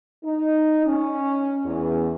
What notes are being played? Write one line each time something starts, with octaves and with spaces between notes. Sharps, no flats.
D#4
C#4
E2